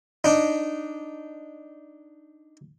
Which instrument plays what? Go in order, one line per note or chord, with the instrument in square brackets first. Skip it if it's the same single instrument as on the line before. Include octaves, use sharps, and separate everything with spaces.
[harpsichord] D4 D#4